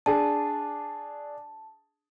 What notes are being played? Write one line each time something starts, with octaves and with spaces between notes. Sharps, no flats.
D4 G#4 A5